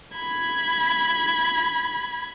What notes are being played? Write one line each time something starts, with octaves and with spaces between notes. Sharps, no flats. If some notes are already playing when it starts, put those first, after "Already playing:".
B5 G#6